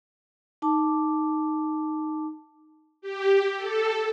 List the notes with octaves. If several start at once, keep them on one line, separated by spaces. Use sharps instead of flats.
D#4 A5 D6
G4
A4